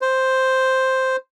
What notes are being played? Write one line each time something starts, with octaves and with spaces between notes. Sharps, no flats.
C5